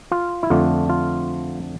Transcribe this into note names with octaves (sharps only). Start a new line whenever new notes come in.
F4
E4
F2 D3 A3 D4 F4
F4